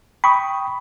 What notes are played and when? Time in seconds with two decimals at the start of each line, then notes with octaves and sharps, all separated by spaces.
0.24 G5 B5 C#6 D#6